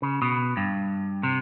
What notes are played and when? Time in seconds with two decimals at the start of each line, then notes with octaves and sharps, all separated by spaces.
0.02 C#3
0.22 B2
0.57 G2
1.23 C3